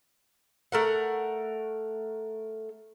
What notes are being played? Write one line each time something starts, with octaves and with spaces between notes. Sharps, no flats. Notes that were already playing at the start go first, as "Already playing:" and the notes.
A3 A#4 F#5